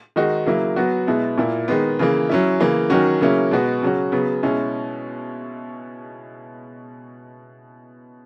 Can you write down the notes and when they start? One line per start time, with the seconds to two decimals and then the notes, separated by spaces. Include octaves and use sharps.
0.16 D#3 G#3 D#4 F#4
0.46 C#3 F#3 A#3 E4
0.76 F#3 B3 F#4
1.07 B2 G#3 B3 E4
1.38 A#2 A#3 E4
1.68 D#3 G#3 B3
1.99 C#3 E3 A#3
2.29 F#3 C#4 E4
2.60 C#3 E3 A#3
2.90 D#3 F#3 C#4 F#4
3.21 C#3 F#3 A#3 C#4 E4
3.51 B2 G#3 B3 F#4
3.82 C#3 F#3 C#4 F#4
4.12 C#3 F#3 B3
4.43 B2 G#3 C#4 E4